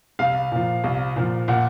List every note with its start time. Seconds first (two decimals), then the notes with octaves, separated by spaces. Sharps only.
0.19 C2 F5
0.51 A#2 F3
0.84 C2
1.16 A#2 F3
1.48 A#2 F#5